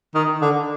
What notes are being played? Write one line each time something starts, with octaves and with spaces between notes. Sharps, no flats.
D#3
D3